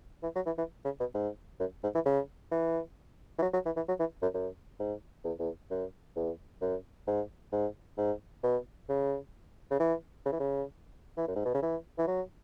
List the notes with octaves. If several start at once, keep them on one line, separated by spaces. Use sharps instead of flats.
E3
F#3
E3
E3
C#3
B2
G#2
F#2
G#2
E3
C#3
E3
E3
F#3
F#3
E3
E3
F#3
E3
F#2
F#2
G#2
E2
E2
F#2
E2
F#2
G#2
G#2
G#2
B2
C#3
C#3
E3
C#3
E3
C#3
E3
F#2
G#2
B2
C#3
E3
E3
F#3